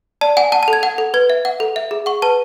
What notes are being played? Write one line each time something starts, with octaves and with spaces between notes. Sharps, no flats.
D5 A5
F#5 G#5
F#5 A5
A5
A4
G#6
F#5
A4
B4 G#6
E5
F#5
A4
E5
G#4
F#5 C#6
B4 A5